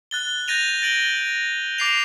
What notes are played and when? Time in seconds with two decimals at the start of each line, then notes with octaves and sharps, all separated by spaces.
0.11 F#6 A6 G7
0.48 G6 A6 A#6 D#7 F7
0.82 A6 D7 F#7 G7
1.78 D6 A6 C7 D7 F7